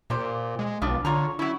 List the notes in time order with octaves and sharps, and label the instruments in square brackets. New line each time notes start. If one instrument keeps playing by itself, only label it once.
[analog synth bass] A#2 [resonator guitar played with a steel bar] G4 C5
[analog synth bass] G#3
[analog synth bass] B1 [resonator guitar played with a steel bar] F3 D4 F4
[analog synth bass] D3 [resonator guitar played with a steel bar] F4 C#5 A#5
[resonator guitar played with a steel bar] F#3 C#4 [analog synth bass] E4